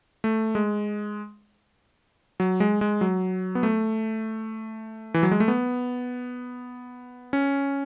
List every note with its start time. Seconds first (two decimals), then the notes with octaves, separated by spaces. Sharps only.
0.24 A3
0.55 G#3
2.40 F#3
2.60 G#3
2.81 G#3
3.01 F#3
3.55 B3
3.63 A3
5.14 E3
5.23 F#3
5.31 G#3
5.40 A3
5.48 B3
7.33 C#4